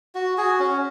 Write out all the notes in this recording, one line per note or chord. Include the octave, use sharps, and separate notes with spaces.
F#4
F#4 G#4
C#4